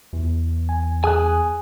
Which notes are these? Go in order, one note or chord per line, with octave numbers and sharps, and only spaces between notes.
E2
G#5
G#4 G#5 D#6 F#6